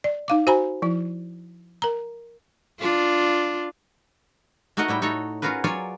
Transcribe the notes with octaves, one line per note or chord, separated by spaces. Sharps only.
D5
D#4 F5 D6
F#4 C5 G#5 A#5 B5
F3 E4
A#4 A#5
D4 F4
A3 D#4 F#4 A#4 D#5 F#5
A2 G3 E4 G5
D#4 F#4 A4 C#5
C#4 F4 F#4 G#4 A#4 B4
F#3 F4 C#5 D5 G#5